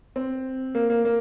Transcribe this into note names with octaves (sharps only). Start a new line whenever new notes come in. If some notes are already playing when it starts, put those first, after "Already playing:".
C4
A#3
A#3
A#3